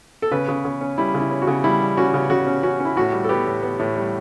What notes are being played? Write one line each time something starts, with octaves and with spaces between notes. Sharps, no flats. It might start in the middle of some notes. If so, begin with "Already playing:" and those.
A4
C#3 B4
C#3
C#3
C#4
G3 E4
C#3
E4
C#4
F#4
C#3
G3 E4
G3
C#4 F#4
C#3
C#3 F#4
C#4
C#4 F#4
C#4
E4
A2 F#4
G3
A4
B3 G4
A2
B3
A2
G3